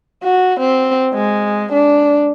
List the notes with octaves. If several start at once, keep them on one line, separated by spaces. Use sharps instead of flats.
F#4
C4
G#3
D4